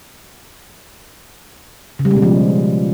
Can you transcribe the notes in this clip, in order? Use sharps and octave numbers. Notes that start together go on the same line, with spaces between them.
C#3
G3
G#3
B2
F3